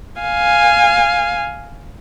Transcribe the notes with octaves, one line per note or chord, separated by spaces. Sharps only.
F5 G#5